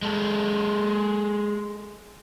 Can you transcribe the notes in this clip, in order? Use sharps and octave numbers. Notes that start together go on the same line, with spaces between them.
G#3 A4